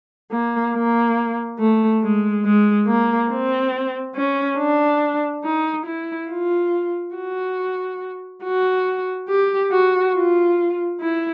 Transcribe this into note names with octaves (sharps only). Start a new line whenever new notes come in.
A#3
A#3
A3
G#3
G#3
A#3
C4
C#4
D4
D#4
E4
F4
F#4
F#4
G4
F#4
F4
E4